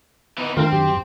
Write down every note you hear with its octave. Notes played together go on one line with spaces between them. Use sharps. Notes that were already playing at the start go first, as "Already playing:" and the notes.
E3 B3 D#4
D#3 A3 C4 D4 F4 A#4
F#2 G4